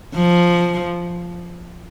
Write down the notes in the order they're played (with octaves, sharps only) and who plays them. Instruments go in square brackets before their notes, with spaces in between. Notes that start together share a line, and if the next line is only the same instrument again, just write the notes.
[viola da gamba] F3